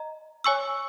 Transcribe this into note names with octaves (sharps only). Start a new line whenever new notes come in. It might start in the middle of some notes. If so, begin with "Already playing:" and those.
Already playing: D#5 A#5
C#5 G#5 C#6 E6